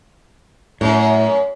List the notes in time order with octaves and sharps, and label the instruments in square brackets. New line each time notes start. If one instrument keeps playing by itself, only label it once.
[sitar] F#2 [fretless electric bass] A2